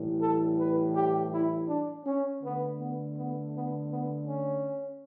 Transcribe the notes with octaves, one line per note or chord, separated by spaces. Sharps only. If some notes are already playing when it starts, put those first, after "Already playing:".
Already playing: A2 E3 G3
A4
B4
G4
E4
D4
C#4
D3 A3 B3
B3
B3
B3
B3
C#4